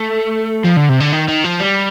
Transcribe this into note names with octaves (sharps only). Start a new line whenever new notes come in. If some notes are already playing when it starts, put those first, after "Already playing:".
Already playing: A3
F3
D3
C3
D3
D#3
D#3
F3
G3